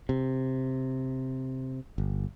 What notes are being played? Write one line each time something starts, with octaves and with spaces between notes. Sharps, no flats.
C3
G1